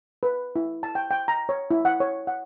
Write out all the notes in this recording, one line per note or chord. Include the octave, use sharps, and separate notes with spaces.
B4
E4
A5
G5
G5
A#5
C#5
E4
F#5
C#5
F#5